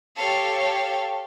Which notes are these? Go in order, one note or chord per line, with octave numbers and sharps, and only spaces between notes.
G4 A4 C#5 F5